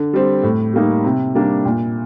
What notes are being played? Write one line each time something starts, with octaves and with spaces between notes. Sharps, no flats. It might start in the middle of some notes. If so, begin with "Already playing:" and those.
Already playing: D3
G3 C4
A2
G3 A#3 D#4
C3
G3 A#3 D4
A#2